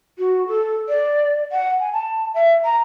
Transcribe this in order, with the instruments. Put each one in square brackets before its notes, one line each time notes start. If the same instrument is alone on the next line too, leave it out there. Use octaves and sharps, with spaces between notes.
[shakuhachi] F#4
A4
D5
F#5
G#5
A5
E5
A#5